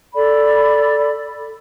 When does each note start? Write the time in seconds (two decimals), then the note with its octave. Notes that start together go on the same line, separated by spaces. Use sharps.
0.14 A4 D5 B5